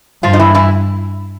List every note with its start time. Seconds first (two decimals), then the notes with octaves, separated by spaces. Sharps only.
0.23 G2 F3 F4
0.33 D#4
0.39 E3 E4
0.55 E3 E4